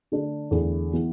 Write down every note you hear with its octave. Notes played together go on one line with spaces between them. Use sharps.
D3 A3 D4
E2 D3 A3
E3 B3